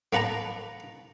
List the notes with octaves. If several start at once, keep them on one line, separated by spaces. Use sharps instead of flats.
A#3 B3 B4 A5 A#5